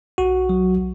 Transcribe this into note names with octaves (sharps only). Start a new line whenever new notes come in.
B1 F#4
F#3